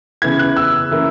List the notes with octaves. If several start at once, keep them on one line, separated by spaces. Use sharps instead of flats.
C#3 E3 B3 E4 G#6
F#6
E6
E3 A#3 C#4 E4